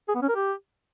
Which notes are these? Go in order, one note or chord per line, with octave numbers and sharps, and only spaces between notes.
G#4
B3
C#4
A#4
G4